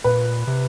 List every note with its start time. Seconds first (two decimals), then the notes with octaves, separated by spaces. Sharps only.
0.04 A#2 B4
0.47 C3